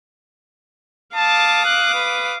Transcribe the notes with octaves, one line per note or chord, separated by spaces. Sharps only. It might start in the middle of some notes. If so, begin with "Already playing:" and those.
F5 A5 D6 D#6
F#6
B4